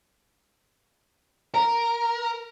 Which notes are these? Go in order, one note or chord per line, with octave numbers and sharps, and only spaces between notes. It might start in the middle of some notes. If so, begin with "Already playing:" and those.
A#4